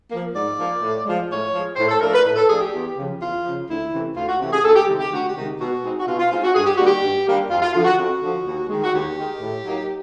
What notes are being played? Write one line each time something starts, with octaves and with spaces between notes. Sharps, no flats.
F3 A#3
G#2 D5
F3 A#3
A2
F3 G#3
A2 C#5
F3 G#3
A2 C5
A4
F3 A3 D4 A#4
B4
A2 B4
A4
F3 A3 D4 G#4
G4
E2
C#3 F3
E2 F4
C#3 F3
D2 E4
C3 E3 A3 C#4
D2 F4
F#4
C3 E3 A3 C#4 G4
G#4
D2 A4
G4
C3 D#3 G#3
G4
D2 F#4
G4
C3 D#3 G#3
B2 F#4
G#3 C4 D#4
F#4
B2 F4
F4
G#3 C4 D#4 F4
F#4
G2 G#4
G4
D#3 G3 A#3 D4 F#4
G4
G2
D#3 G3 A#3 D4
F2 F4
F4
D3 F3 F4
F#4
F2 F#4
D3 F3
D#2
D#3 G#3
F#4
D#2 G4
D#3 G#3
A2
F#3 A#3 D#4